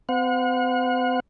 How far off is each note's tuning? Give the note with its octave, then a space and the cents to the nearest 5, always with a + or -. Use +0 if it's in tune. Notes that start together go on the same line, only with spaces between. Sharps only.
C4 -40 F#5 -40